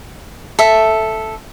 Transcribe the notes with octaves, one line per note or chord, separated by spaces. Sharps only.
A4 E5